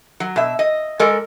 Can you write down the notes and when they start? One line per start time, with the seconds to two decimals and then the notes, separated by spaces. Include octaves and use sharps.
0.20 F#3
0.36 B2 E5
0.59 D#5
0.99 G#3 A4 A#4 D5